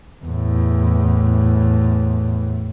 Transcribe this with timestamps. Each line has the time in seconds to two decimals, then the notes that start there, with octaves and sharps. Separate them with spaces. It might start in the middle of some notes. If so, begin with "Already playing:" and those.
0.24 E2 A2